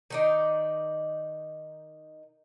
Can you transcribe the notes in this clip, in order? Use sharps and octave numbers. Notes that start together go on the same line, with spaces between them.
D#3 D#4 D5